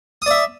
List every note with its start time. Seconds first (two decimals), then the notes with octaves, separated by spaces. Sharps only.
0.22 D#6
0.26 D5
0.31 E5